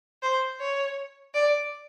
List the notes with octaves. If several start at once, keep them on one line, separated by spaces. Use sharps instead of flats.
C5
C#5
D5